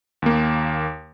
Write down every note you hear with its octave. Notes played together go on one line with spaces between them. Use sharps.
D#2 A#3